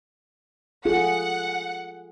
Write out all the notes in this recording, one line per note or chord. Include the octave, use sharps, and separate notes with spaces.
F4 G#4 A4 F#5